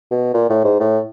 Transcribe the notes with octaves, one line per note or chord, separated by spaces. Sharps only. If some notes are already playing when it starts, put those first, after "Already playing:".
B2
A#2
A2
G#2
A2